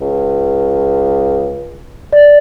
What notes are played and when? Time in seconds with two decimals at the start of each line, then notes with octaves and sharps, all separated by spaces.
0.01 C#2
2.13 D5